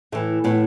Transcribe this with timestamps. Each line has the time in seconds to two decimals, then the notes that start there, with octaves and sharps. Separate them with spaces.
0.12 A2 E3 A3
0.44 A2 E3 B3